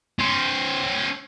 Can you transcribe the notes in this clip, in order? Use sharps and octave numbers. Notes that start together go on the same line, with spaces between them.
C#4 C5